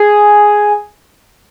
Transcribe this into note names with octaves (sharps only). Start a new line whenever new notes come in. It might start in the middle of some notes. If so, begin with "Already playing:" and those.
Already playing: G#4